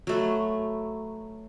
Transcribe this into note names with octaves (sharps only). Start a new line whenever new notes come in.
F#3 A3 B4